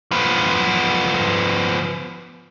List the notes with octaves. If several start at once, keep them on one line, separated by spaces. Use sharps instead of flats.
F3 B3